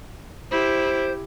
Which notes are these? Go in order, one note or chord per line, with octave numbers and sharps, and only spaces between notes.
E4 G4 C5